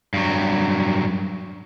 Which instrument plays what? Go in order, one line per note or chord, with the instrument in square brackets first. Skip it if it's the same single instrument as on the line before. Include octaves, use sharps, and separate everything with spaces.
[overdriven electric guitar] G2 F#3